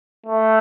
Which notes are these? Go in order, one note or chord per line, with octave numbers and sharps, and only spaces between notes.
A3